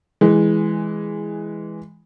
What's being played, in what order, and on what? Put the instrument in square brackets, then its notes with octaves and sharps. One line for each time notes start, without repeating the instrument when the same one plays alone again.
[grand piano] E3 G#3